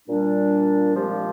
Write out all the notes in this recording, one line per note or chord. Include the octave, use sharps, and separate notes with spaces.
A#2 G3 D4
A#2 F3 G#3 C4 G4